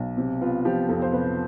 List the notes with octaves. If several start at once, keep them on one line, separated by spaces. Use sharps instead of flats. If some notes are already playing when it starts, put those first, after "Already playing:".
Already playing: B1
C3
B3 F4
F3 G4
F2 A4
C5
C3 B4